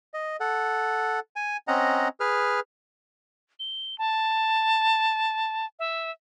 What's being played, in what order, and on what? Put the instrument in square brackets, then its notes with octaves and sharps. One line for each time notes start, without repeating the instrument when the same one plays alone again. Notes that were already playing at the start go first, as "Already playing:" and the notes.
[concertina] D#5
A4 F#5
G#5
C4 C#4 D#5 F#5 A#5
G#4 B4 F6
[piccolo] G7
A5
E5